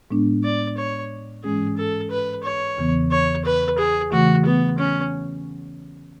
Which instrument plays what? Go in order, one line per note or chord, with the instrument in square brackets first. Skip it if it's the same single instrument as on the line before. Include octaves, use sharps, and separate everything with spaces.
[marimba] A2 G#3 B3 D4
[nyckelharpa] D5
C#5
[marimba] G#2 E3 G#3 C#4 [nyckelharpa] G#4
[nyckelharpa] A4
B4
C#5
[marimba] E2 C#3 E3 B3
[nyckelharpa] C#5
B4
G#4
[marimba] C#3 E3 A3 [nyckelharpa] F#4
[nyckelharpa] B3
C#4